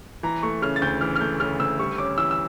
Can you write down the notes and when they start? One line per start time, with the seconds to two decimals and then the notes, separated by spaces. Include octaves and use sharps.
0.23 E3 A#5
0.43 A3 C#6
0.62 C#3 F6
0.76 A6
0.82 D2 G6
1.01 E3 F6
1.15 F6
1.21 A3 G6
1.40 C#3 F6
1.60 D2 E6
1.79 G3 C#6
1.98 C#4 D6
2.18 E3 E6
2.31 E6